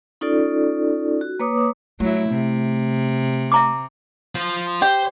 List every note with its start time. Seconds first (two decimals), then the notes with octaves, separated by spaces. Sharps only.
0.21 C#4 D#4 F4 A4 D5
1.21 F#4
1.40 A#3 B4 C#5 D6 D#6
2.00 F#3 A3 E4
2.30 C3
3.52 E5 A#5 D6
4.35 F4 C5
4.82 G4 C5